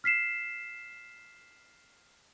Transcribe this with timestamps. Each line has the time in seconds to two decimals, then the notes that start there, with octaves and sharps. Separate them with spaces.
0.04 F6 B6 C7 E7